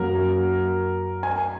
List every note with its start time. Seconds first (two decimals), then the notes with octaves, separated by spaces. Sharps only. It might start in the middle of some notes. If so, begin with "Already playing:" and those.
Already playing: F#2 F#3 A#3 F#4 A#4
1.23 G#5